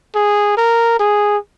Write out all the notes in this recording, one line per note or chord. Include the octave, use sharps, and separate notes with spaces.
G#4
A#4
G#4